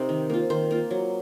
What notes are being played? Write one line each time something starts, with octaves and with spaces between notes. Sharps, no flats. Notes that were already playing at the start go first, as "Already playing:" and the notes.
Already playing: C3 C4 D#4 A#4 C5
D#3
A#3 F4
D#3 C5
A#3 F4
F#3